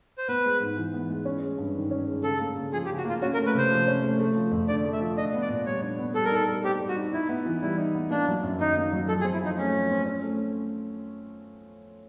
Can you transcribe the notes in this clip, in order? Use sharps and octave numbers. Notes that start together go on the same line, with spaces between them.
C5
B3 B4
G#3
G#2
E3
B3
G#3
C#4
G#3
G2
D#3
C#4
G#3
C#3 A4
A#3
C#3
F3 G#4
G4
C#3
F#4
A#3 F4
C#4 F#4
A#4
A3
B4
C3 C5
F3
C#4
A3
A3
F3
F2
D3 D5
A3
E5
F3
D4 D#5
B3
D5
A#2
G3 C#5
D4
B3
G3 A4
A#4
D#4 A4
G3
C4 G4
G3
F#4
D#4
D#4 E4
B3
E3
G3 E4
D#4
B3
A#3 D4
F#3
F#2
D#3 D#4
A#3
F#3
F3 A4
G#4
C4
E4
F3 D#4
A3 C#4
F3
C4
C#4
A3